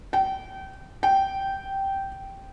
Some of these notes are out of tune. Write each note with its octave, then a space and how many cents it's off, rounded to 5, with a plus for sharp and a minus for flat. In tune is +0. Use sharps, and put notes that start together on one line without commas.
G5 -30
G5 -10